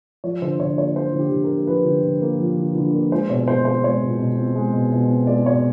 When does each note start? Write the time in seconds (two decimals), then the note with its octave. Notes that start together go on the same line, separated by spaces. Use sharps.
0.24 F3 C#5
0.42 D3 C5
0.60 D3 C#5
0.78 A#3 C#5
0.96 F3 C5
1.14 D3
1.20 G4
1.31 D3
1.44 A#4
1.50 A#3
1.67 F3 B4
1.85 D3
2.03 D3
2.22 A#3
2.40 F3
2.57 D3
2.75 D3
2.93 A#3
3.12 G#3 C5
3.29 B2 C#5
3.48 B2 C5
3.65 C4 C5
3.84 G#3 C#5
4.02 B2
4.19 B2
4.37 C4
4.55 G#3
4.73 B2
4.92 B2
5.09 C4
5.27 G#3 D5
5.46 B2 C#5